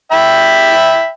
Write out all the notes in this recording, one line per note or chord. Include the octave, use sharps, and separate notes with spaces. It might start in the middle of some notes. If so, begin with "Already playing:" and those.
E5 G5 B5